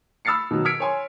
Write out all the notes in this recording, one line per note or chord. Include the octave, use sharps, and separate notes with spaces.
B5 E6 F6 A6 C7 C#7
B2 D#3 F#3
E6 F6 G#6 B6 C#7 D7
C#5 G#5 C6